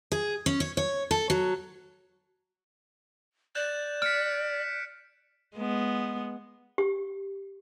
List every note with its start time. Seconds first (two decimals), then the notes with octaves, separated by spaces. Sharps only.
0.12 G#4
0.46 C#4
0.60 C#5
0.77 C#5
1.11 A4
1.30 F#3
3.55 D5 F#6 G6 E7
4.02 F6 B6 C#7 D7
5.56 G#3 B3
6.78 G4